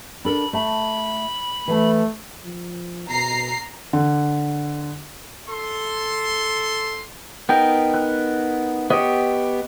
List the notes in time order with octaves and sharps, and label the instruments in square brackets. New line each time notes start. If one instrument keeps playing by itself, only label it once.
[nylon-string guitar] D4 A4 A#4 [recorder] B5
[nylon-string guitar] A3 A5 [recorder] B5
[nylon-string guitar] E3 A5 [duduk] A3
[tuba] F3
[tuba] B2 [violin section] A#5 C7
[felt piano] D3
[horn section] A4 C6
[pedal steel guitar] B3 D#4 A#4 [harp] G5
[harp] F#6
[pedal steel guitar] B3 G4 [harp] C#5 D#5